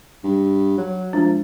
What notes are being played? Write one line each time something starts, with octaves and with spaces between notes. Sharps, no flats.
G2
F#3
F3 G#3 D4